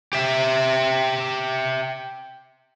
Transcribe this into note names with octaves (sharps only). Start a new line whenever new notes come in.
G4 E5